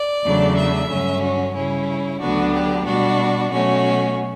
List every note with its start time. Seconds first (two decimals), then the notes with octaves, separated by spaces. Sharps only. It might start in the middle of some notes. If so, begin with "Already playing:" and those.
Already playing: D5
0.24 E2 C#3 F#3 A3 D4
0.57 E5
0.89 G2 D3 F#3 C#4
1.22 F#4
1.55 C#3 G3 C#4 E4
2.20 D2 D3 F#3 B3 D4 F#4
2.53 G4
2.85 B2 G3 D4 F#4
3.51 B2 F#3 A3 C#4 F#4